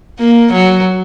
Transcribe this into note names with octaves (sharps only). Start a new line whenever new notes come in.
A#3
F#3